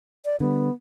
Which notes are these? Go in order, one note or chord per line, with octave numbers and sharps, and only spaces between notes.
D5
D3 G3 B3